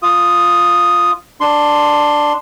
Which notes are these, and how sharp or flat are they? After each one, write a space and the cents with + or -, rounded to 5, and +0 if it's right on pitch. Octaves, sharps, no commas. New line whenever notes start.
F4 +0 D#6 +0
D4 +5 C6 +0